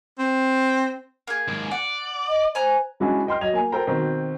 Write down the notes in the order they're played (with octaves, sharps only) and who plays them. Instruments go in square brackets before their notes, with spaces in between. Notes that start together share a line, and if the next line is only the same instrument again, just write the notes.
[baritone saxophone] C4
[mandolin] A#3 G#4
[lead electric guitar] D#2 G#2
[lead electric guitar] D5 [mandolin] F#5
[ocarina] D#5
[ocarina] C5 [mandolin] G#5 A#5 F#6
[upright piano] C#3 G#3 D4 E4 F#4 G#4
D#5 G5 C6 F6
F#3 D#5 G#6 F7
A#3 G#5
A4 A#4 C5 G5 A#5
B2 D#3 C4